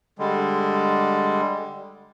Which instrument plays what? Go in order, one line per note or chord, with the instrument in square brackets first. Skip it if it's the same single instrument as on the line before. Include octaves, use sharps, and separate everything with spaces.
[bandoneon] D3 G3 G#3